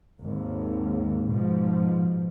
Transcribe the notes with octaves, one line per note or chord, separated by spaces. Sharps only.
G#1 D#2 G#2
G#2 B2 F3